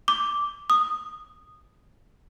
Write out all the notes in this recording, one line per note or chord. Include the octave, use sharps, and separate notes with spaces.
D6
D#6